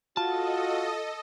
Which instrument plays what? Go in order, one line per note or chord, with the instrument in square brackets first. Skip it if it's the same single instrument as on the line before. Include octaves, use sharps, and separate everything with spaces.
[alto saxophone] F4 [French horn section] F#4 [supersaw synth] A4 D#5 [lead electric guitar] A5